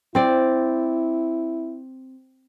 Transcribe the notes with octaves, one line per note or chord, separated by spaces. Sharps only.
C4 E4 D5